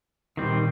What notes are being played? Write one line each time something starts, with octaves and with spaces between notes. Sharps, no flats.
A#2 D#3 G3 C4